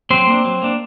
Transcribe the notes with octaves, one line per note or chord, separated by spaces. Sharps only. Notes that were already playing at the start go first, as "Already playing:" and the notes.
F#3 C4 C5
A#3 D4
F#3
A#3 D4